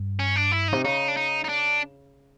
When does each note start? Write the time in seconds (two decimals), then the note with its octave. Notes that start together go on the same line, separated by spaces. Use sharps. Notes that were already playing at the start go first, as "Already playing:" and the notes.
Already playing: G2
0.19 C#4
0.36 D4
0.52 E4
0.68 C3 D#4
0.84 C#3 D#4
1.08 D4
1.17 D#4
1.44 D#4
1.49 D4